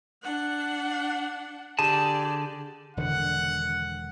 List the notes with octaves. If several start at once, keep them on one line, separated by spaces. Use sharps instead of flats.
D4 F#5
D3 G4 G#4 D5 A5
E1 D3 D#3 F#5